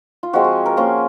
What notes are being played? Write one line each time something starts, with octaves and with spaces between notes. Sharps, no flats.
F4
F3 G#3 C4 F#4
G#4
A#4
A#3 C#4 F4 C5